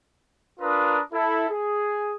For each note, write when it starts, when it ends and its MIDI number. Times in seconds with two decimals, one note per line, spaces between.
0.60 0.98 62
0.60 0.98 65
0.60 0.98 70
0.60 0.98 71
0.60 0.98 82
0.60 0.98 87
1.12 1.48 64
1.12 1.48 69
1.49 2.16 68